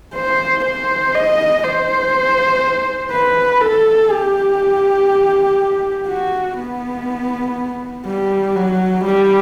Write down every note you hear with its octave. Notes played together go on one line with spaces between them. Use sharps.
C5
C5
D#5
C5
B4
A4
G4
F#4
B3
G3
F#3
G3